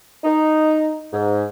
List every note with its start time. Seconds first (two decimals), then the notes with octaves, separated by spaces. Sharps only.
0.24 D#4
1.12 G#2